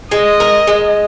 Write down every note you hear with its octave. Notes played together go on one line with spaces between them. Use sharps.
G#3 D#5
A#4
G#3